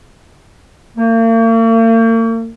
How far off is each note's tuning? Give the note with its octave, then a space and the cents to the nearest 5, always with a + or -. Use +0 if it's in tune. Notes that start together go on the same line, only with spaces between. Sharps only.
A#3 -45